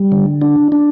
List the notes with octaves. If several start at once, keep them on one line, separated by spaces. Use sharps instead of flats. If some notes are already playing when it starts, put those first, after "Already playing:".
Already playing: G3
D3
D4
D4